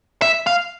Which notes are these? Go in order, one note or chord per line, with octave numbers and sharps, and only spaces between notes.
E5
F5